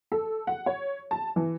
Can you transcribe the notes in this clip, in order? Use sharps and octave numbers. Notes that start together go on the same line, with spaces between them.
A4
F#5
C#5
A5
E3